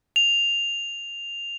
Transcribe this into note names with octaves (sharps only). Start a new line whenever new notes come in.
F7